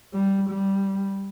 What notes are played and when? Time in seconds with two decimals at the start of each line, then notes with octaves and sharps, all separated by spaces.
0.14 G3
0.50 G3